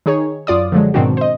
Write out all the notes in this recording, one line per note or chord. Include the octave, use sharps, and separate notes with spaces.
D#3 D#4 G#4 C#5
F#2 F4 D5 D#6
D3 F3 F#3 G#3
G#2 B2 D#3 C4 D4 F#4
C5 D#5